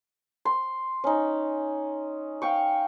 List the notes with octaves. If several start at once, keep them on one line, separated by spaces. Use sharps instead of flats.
C6
C#4 D#4
F5 G5 C#6